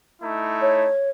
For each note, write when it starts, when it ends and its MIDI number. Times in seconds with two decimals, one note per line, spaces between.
0.22 0.88 57
0.22 0.88 63
0.22 0.88 64
0.62 1.10 73